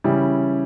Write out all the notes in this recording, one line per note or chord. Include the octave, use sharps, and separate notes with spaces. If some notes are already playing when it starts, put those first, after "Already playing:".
C#3 E3 G3 C#4 E4